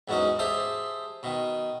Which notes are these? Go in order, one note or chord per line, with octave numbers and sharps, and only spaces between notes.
E2 G#2 F#3 C#4 D#4
G4 G#4 C5 E5 G#5 A5
B2 D#3